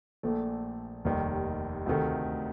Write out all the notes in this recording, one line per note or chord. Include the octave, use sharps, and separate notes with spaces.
A#1 A#2 A3
F1 D#2 D#3 G3
D2 C3 D#3 A3